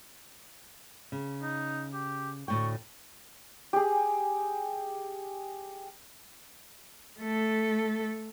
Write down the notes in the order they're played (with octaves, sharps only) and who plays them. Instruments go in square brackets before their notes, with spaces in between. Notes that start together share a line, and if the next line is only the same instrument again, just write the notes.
[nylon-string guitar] C#3
[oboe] D#4
G4
[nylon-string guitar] D2 A2 G5 [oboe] C#6
[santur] G4 G#4
[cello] A3 A4